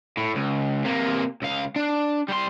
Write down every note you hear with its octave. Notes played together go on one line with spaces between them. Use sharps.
A2
C#2
C3 A#3
C#2 F5
D4
G3 C6